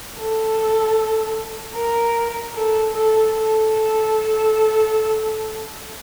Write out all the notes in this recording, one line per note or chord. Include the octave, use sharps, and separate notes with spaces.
A4
A#4
A4
A4
A4